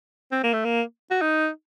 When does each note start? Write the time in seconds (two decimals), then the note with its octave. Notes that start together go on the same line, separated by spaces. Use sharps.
0.32 C4
0.44 A#3
0.53 A3
0.65 A#3
1.11 F#4
1.22 D#4